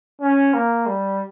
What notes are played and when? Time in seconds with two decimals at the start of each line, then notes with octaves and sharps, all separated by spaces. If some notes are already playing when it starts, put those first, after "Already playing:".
0.21 C#4
0.54 A#3
0.87 G3